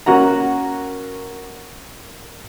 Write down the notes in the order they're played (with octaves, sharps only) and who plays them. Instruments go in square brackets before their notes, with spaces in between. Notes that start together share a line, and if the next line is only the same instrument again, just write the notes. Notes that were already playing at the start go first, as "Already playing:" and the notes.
[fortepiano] A#3 C#4 F#4 F#5 A#5